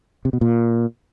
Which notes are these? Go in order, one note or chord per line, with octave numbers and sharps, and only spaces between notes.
C3
B2
A#2